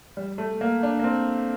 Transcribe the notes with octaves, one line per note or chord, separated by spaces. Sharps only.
G3
A3
A#3
D4
A#3
C4